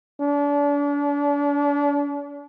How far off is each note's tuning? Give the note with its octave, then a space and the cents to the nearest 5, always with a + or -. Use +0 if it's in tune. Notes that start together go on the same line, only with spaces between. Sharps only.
D4 -35